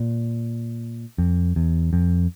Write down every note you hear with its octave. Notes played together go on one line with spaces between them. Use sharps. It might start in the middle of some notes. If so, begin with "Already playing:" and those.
Already playing: A#2
F2
E2
F2